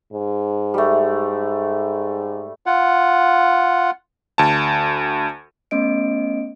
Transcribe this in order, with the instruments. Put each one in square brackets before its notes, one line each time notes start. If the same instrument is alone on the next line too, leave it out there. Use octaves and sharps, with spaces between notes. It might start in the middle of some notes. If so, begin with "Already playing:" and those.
[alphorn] G#2
[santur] G3 A3
[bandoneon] F4 F#5
[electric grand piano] D2 A5
[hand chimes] A3 B3 C#4 D#5 D7